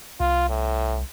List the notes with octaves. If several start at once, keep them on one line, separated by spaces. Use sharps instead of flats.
C2 F4
A2